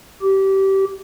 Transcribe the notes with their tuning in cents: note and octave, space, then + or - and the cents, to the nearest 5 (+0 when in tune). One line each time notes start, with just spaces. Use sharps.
G4 -20